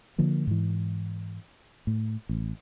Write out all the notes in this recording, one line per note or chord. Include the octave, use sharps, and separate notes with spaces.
D3 F3 A#3
G#2 E3
A2
A1